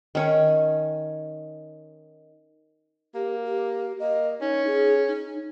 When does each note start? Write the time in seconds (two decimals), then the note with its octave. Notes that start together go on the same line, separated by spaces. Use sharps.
0.15 D#3 C#4 G#5
3.15 A#3 G4
3.45 G4
4.00 A#3 D#5
4.41 C#4 D#4
4.67 G#4
5.08 D#4